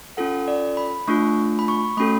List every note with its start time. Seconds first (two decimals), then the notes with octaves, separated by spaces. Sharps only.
0.17 C#4 F4 A4 F#5
0.48 D5
0.77 B5
1.08 A3 D4 F4 C#6
1.59 B5
1.68 C#6
1.97 A3 C#4 F#4 A4 B5